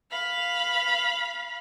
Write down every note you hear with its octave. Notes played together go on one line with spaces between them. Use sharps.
F5 B5